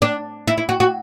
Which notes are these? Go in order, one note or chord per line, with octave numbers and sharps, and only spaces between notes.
D4
E4
E4
F#4
F#4